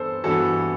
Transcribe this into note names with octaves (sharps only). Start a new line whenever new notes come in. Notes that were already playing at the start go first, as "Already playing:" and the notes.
Already playing: G2 E3 B3 A4 C5
G2 E3 B3 F#4 A4